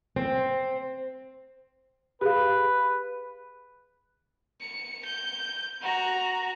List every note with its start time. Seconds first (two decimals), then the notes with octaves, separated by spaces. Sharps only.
0.16 C4
2.21 G4 G#4 B4 F5
4.61 C#7
5.05 G6
5.82 F#4 A#5